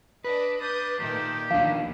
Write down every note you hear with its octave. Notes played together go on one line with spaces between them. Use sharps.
D4 B4 D#5
D4 D#6 G6
A#2 D#3 A3 G4
D#2 B2 D#3 F3 D4 F5